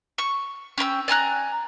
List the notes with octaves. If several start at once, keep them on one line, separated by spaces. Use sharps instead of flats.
C#6
C#4 G5 B5 E6
D5 G#5 A#5 F#6